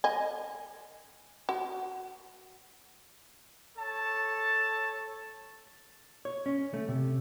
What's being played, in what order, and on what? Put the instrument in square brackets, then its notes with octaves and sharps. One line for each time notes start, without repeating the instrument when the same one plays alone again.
[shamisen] D#5 G#5
F#4
[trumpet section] A4 C#5 A5
[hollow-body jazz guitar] C#5
C#4
A3
C3